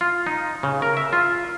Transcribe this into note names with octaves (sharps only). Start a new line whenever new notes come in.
F4
D#4
C#3
A#4
E5
F4